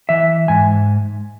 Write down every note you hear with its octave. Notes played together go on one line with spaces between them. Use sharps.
E3 E5
G#2 G#5